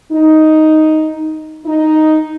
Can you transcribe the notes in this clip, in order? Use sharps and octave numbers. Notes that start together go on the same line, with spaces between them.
D#4
D#4